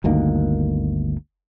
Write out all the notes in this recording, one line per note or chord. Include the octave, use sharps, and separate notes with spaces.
G1 D2 D#3 A#3